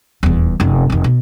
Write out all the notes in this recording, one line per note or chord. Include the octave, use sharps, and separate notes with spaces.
D#1 E2
F1 F#2
F1 D#3
B2